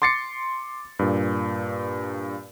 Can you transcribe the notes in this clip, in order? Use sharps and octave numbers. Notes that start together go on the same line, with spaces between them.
C6 D6 A6 C7 C#7
G2 A#2